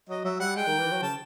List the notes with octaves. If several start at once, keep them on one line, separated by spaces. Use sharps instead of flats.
F#3 D#5
F#3 E5
G3 F#5
G#3 G5
D#3
E3
F#3
C#3 A5